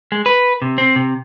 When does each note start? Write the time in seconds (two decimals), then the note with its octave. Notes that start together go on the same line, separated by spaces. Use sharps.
0.12 G#3
0.26 B4
0.62 C3
0.78 C4
0.96 C3